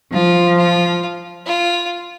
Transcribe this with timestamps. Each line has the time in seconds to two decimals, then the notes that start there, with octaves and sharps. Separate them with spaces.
0.13 F3 F4
0.58 F4
1.47 F4